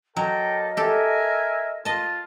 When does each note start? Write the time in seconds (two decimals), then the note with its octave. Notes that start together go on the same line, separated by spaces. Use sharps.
0.16 F#3 A#3 A4 D#5 G5
0.77 G4 A4 A#4 E5 G#5
1.85 F4 D#5 A5